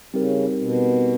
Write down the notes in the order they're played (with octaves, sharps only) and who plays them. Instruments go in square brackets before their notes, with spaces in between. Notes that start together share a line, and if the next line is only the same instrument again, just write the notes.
[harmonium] C#3 [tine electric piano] G3 C4 D#4 G4 A#4
[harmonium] B2